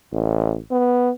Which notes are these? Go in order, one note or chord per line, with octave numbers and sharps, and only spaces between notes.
A1
B3